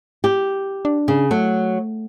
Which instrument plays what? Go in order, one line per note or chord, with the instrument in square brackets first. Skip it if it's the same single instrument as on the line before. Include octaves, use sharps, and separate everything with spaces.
[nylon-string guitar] G4
[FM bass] D4
[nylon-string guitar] C#3
[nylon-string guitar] F#3 [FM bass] A3